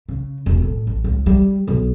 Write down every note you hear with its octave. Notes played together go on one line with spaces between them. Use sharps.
C#3
E1
A2
A1
C#2
G3
B1